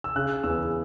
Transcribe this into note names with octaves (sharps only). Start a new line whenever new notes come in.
E6
C#3 F#6
E2 E6